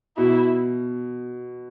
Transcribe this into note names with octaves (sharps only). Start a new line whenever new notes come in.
B2 E4